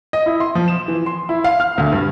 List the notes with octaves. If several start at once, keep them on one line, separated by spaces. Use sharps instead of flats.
D#5
E4
C6
F3
E7
E3
C6
E4
F5
F6
D2
G2